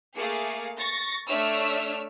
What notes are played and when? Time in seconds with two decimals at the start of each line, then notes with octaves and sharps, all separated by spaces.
0.15 A3 A#3 G#4 F5 C#7
0.79 C#6 A6 A#6
1.28 A3 D4 C#5 E5 E6 F6